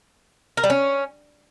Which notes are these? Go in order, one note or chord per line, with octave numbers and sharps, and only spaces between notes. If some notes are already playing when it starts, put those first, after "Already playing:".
A#4
G3
C#4